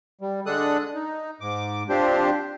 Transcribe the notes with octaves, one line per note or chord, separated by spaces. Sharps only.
G3
D3 G#3 D4 A4 D#6 F#6
D#4
G#2 D6
F3 C4 D4 G4 C5